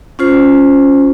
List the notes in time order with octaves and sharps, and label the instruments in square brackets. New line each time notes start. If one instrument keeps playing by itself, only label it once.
[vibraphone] C#4 F4 C5